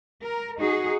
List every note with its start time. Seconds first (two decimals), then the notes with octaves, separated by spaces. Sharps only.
0.22 A#4
0.58 D#4 F#4 G#4